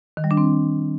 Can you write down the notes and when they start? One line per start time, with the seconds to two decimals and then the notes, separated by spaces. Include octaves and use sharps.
0.17 D#3
0.24 G3
0.31 D4
0.37 C4